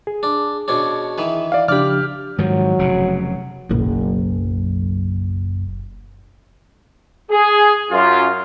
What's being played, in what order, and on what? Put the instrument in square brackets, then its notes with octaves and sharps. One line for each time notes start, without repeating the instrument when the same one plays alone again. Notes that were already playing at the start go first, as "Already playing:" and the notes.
[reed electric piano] G#4
[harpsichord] D4
B2 C#4 D4
D#3 E3 B4
[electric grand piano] D5 F5
[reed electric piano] C#3 F3 D4 [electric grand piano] G4 F6 [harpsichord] D5 B5
[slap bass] G#2 D#3 F3 [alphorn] F#3
[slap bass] F1 C#3
[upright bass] F#1 B1
[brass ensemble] G#4
F#2 F4